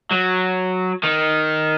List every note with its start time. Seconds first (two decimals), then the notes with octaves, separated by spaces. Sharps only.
0.12 F#3
1.03 D#3